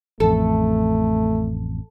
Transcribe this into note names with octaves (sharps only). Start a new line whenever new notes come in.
A1 F2 A3 A4